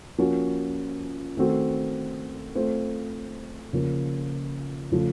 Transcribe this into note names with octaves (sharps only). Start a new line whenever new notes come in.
F3 A#3 C#4 F#4
D#3 A3 C4 F#4 A4
A3 C4 F4 C5
C#3 F3 A#3
C#3 F3 A3